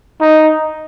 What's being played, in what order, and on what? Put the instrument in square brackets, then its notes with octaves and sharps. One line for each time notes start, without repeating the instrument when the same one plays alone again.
[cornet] D#4